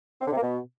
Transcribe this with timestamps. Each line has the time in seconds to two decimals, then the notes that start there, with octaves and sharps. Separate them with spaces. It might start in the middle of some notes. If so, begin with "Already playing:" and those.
0.21 C4
0.26 D3
0.31 C3
0.37 A#3
0.42 B2